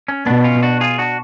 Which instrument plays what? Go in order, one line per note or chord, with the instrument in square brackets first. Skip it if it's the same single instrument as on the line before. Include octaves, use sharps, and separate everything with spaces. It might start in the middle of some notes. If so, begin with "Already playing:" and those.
[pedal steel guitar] C#4
[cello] B2 [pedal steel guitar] B3 D4
[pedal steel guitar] C#4 F4
D4 F#4
F4 G#4
D4 F#4